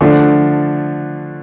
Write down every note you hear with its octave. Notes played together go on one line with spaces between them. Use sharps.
D3 F3 A3 D4